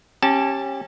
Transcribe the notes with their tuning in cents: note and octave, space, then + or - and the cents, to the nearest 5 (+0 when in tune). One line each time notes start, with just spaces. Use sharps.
C#4 -25 G4 +0 A5 +0